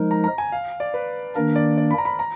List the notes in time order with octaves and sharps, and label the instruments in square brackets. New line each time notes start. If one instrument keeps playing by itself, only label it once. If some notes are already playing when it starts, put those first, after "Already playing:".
Already playing: [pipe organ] F3 G#3 D#4 A#4
[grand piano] A#5
A#5
G#5
F5
D5
B4
[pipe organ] D#3 A#3 D4 [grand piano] A#4
[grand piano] D5
D5
B5
A#5
B5
A#5